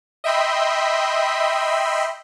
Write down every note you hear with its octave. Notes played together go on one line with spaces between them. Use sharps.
D#5 E5 G5 B5 C6